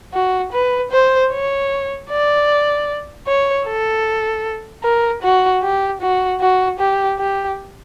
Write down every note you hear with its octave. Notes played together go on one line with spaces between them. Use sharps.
F#4
B4
C5
C#5
D5
C#5
A4
A#4
F#4
G4
F#4
F#4
G4
G4